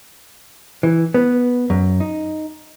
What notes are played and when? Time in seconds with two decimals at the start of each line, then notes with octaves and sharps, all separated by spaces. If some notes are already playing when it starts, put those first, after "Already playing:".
0.83 E3
1.14 B3
1.70 F#2
2.00 D#4